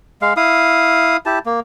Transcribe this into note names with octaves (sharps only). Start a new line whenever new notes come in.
G#3 F5
E4 F5 D#6
E4 G4 A5
A#3